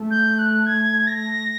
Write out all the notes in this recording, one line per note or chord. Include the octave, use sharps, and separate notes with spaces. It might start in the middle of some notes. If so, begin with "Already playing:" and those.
Already playing: A3
G6
F#6
G#6
A#6